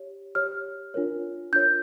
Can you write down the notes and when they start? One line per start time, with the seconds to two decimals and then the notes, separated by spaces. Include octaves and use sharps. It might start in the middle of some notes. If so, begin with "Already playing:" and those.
Already playing: G4 C#5
0.35 G4 C#5 F6
0.94 D4 F4 A#4 C#5
1.53 D4 F4 A#4 C#5 G6